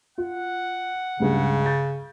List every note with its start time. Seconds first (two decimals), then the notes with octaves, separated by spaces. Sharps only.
0.18 F4 F#5
1.20 C#2 G2 C#3
1.66 G6 A6